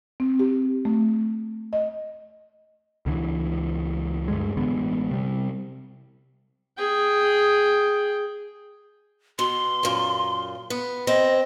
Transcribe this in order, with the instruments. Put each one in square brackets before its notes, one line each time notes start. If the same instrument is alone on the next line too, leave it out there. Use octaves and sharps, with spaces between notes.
[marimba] C4
G4
A3
D#5
[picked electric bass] C#2 D3 E3
D2 G2 G3 G#3
A1 D3 G#3 B3
C3 G3
[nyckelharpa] G#4 G5
[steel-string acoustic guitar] B2 [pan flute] C6
[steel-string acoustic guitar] F#2 A#2
B3
[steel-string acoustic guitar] C4 [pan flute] D#5